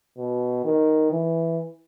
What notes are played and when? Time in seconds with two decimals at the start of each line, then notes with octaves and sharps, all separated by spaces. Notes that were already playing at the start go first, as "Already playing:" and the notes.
0.18 B2
0.65 D#3
1.11 E3